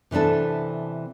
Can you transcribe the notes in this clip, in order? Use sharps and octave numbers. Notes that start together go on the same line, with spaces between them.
C3 E3 B3 D4 A4